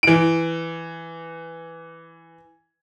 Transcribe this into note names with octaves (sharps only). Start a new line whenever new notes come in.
E3 D7